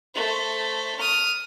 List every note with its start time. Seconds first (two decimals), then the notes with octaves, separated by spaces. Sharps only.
0.15 A3 C5
0.99 D#6 F6